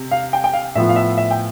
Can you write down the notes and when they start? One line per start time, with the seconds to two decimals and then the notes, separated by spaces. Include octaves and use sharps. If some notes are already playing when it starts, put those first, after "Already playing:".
Already playing: C3
0.11 F5
0.33 G5
0.44 G5
0.53 F5
0.75 A2 F3 B3 E5
0.89 F5
0.96 E5
1.18 E5
1.31 G5